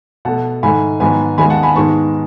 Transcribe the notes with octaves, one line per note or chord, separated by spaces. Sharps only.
B2 A3 F#5 A5
G#2 D#3 A3 G#5 B5
G#2 D#3 F#3 B3 G#5 B5
D#2 D#3 G#3 B3 G#5 B5
F#5 A5
G#5 B5
G#2 D#3 G#3 B3 A5 C#6